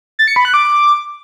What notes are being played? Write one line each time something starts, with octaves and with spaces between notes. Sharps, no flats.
A6
C#7
B5
F#6
D6